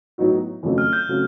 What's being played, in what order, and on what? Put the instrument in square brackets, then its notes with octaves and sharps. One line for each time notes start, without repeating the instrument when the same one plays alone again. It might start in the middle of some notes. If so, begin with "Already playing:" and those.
[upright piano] A2 F#3 B3 D#4 F#4
F2 C#3 F#3 A3 C4
[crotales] F6
G6
[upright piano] C#3 F#3 A3 C4